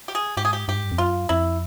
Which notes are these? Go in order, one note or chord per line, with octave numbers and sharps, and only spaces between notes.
G4
G#4
G#2 G4
G#4
G4
G2 G4
G#2
G2
F2
F#2 F4
F2 E4